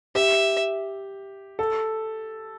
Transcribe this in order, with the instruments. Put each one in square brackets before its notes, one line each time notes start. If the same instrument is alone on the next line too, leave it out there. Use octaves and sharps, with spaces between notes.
[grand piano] G4 [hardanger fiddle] E5
[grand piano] A4